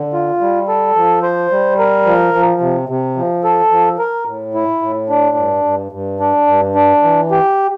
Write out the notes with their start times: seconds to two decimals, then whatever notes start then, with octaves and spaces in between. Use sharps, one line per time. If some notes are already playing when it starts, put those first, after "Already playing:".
Already playing: D3
0.13 F4
0.41 G3
0.68 A4
0.96 F3
1.22 C5
1.51 G3
1.79 A#4
2.05 F3
2.34 F3
2.61 C3
2.89 C3
3.16 F3
3.44 A4
3.72 F3
3.99 A#4
4.27 A2
4.54 E4
4.82 A2
5.09 D4
5.36 G2
5.64 G2
5.92 G2
6.20 D4
6.47 G2
6.75 D4
7.03 E3
7.31 G4